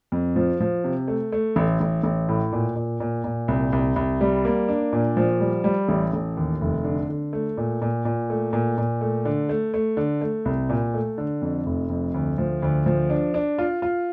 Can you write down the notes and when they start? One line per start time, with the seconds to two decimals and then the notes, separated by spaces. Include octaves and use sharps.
0.12 F2
0.36 F3
0.60 F3
0.84 C3
1.08 A3
1.32 A3
1.56 A1
1.80 A1
2.04 A1
2.29 A2
2.52 A#2
2.76 A#2
3.00 A#2
3.24 A#2
3.48 C2
3.73 C2
3.96 C2
4.21 G3
4.45 A#3
4.69 D4
4.93 A#2
5.17 F3
5.40 G3
5.64 G3
5.89 A1
6.13 A1
6.37 D#2
6.61 F1
6.84 D3
7.09 D3
7.33 A3
7.57 A#2
7.82 A#2
8.05 A#2
8.30 A3
8.53 A#2
8.78 A#2
9.01 A3
9.25 D3
9.49 A3
9.74 A3
9.97 D3
10.21 A3
10.45 C2
10.69 A#2
10.94 A3
11.18 D3
11.42 F2
11.66 F1
11.90 F2
12.14 D2
12.38 F3
12.62 D2
12.86 F3
13.10 D4
13.34 D4
13.58 F4
13.82 F4